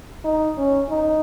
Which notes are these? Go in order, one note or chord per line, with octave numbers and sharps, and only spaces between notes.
D#4
C#4
D#4